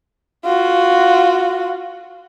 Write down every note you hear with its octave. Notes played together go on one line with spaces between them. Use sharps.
F4 F#4